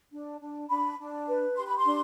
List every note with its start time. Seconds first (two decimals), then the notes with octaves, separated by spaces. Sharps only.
0.12 D4
0.41 D4
0.69 D4 B5
0.99 D4
1.27 B4
1.56 G4 C6
1.67 B5
1.77 C6
1.85 D4